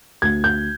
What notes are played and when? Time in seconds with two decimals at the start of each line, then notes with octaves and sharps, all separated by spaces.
0.22 D2 G#6
0.44 G6